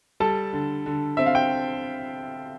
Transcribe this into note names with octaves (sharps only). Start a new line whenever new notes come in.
G3 A4 A5
D3
D3
C4 E5
F5
G5